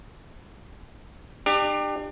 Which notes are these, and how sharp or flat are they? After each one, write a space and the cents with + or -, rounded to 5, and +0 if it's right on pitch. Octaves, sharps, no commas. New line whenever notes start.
D4 +40 G4 +20